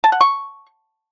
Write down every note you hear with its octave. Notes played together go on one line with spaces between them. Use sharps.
A5
F#5
C#6